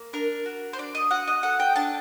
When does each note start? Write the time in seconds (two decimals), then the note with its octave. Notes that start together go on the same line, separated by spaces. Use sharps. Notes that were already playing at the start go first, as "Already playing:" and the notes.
Already playing: A#3
0.13 D4 A#4
0.46 F#4
0.73 C5
0.78 D4 D5
0.95 D#5
1.11 F#4 F#5
1.27 D#5
1.43 A4 F#5
1.60 G5
1.76 D4 A5